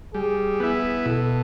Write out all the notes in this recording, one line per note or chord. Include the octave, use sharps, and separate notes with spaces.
G3 G#4
B3 E4
B2 A4